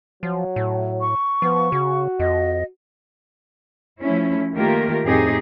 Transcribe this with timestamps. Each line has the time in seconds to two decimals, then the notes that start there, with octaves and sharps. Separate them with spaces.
0.23 F3 F#3
0.56 A2
1.01 C#6
1.42 F3 B3
1.72 C#3 F#4
2.20 F2 D#5
4.00 F3 A3 C#4 E4
4.55 D#3 A3 A#3 F4 G4 A#4
5.04 F2 A2 C4 D#4 G4 G#4